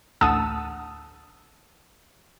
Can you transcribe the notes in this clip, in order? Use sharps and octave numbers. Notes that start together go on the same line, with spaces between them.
A1 D2 F#5 A5 D#6 E6